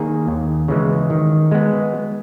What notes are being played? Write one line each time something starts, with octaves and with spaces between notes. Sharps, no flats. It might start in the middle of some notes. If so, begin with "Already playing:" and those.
Already playing: D#3 A#3 D#4 G#4
D#2
C#3 E3 G#3
D#3
G#3 B3